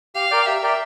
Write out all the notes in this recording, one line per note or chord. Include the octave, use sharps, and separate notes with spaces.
G4 F5
A#4 D5 G5
G4 E5
A#4 D5 G5